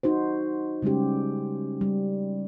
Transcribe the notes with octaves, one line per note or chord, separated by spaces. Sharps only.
D#4 F#4 C5
C#3 G3 G#3 C#4 G4
G3